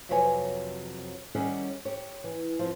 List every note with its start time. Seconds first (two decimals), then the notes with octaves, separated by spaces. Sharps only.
0.09 F2 C3 F#3 B4 C#5 G#5
1.35 D#3 G3 C#4 E4 G#4 F#5
1.85 G4 C#5
2.24 E3
2.59 F3 C4